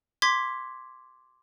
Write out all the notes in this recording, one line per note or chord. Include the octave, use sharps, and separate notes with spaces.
C6 D6 G#6 B6